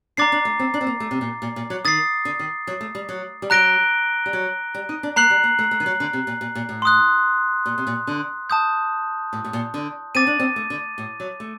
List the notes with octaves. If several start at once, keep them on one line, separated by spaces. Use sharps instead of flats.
D4 A#5 D6 A6 C7
D4
A3
C4
D4
C4
A#3
A3
C3
A#2
A#2
A#2
F#3
D#3 D#6 A6 C7
D3
D#3
F#3
A3
G3
F#3
G3
F#3 A#5 F#6 A#6 D7 G7
G3
F#3
G3
D#4
D4
A#3 A#5 F#6 C7 F#7
G3
A#3
A3
A3
D#3
F#3
D3
C3
A#2
A#2
A#2
A2
C6 D#6 F#6
A#2
C3
A#2
D3
A5 D#6 G6
A2
A2
A#2
D3
C4 D6 A6 D#7
D4
C4
A3
D3
A2
F#3
A3